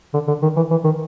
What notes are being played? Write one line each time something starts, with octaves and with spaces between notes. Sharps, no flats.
D3
D3
D#3
E3
E3
D#3